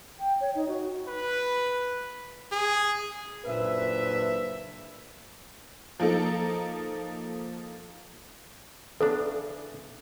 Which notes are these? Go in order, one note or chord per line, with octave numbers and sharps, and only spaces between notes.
G5
C#5
D#4
F#4
B4
G#4
F#1 A#2 D4 B4 C5 E5
F3 A#3 D#4 A4
E2 C#3 D4 A4